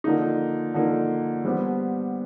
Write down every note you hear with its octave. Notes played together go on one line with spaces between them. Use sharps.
D3 F3 A#3 D#4
D3 F3 A#3 D#4
G3 B3 D4 G4 C5